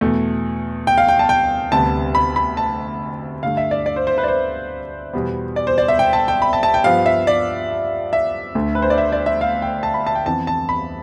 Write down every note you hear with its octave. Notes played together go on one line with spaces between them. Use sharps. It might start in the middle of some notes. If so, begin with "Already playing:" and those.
E2 B2 A3
G5
F5
G5
A5
G5
D2 C3 G3 B3 A5
B5
B5
A5
G2 D3 A3 F5
E5
D5
D5
C5
C5
B4
D5
C5
E2 B2 G3 B3
D5
C5
D5
E5
G5
A5
G5
B5
A5
A5
G5
G2 F3 B3 F5
E5
D5
E5
D2 D3 A3
B4
C5
D5
E5
D5
E5
F5
G5
A5
B5
A5
G5
F2 E3 B3 A5
A5
B5